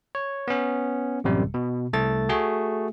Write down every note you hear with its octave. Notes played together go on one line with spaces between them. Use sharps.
C#5
B3 C#4
A1 F#2 C3 G3
B2
C2 A3 A4 A6
A3 F#4 G#4